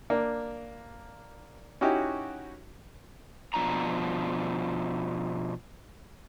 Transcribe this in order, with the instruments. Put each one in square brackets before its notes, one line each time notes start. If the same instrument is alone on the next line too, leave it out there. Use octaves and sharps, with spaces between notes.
[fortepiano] A#3 D4
C#4 D#4 E4 F#4 G4
[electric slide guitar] B2 F3 D4 A#5